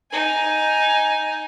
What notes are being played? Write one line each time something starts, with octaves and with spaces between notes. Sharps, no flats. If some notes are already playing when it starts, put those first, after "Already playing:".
D#4 G#5